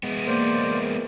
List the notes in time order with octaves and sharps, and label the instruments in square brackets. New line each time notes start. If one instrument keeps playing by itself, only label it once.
[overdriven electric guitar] G#3 B3
[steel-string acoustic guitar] A#3 [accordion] C5 D5